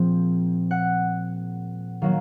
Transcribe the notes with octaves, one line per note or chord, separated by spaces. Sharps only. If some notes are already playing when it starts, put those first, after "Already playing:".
Already playing: A#2 F3 G#3 C4
F#5
D#3 F#3 A#3 F5